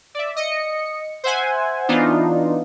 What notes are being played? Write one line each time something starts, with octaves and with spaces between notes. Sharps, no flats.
D5 E5
D#5 C#7
C5 E5 F#5 G#5
E3 B3 D4 D#4 F4